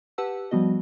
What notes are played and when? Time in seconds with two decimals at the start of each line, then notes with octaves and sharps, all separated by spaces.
0.18 G4 B4 F#5 A5 E6
0.51 F3 G3 B3 F#4 D#5